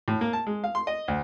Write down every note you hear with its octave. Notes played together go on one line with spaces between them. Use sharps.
A2
A#3
A5
G#3
F5
C6
D#5
D2